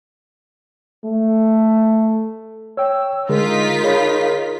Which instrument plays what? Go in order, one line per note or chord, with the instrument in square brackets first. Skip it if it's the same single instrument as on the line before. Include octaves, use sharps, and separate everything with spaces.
[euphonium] A3
[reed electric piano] C#5 G5 [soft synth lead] E6
[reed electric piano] D3 G#3 G#4 [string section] D#4 F4 B6 [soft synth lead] A#4
[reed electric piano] G#4 C#5 B5